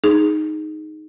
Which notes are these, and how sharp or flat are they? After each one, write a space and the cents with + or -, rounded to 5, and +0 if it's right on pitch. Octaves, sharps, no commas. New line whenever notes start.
D#4 +0 G#4 +5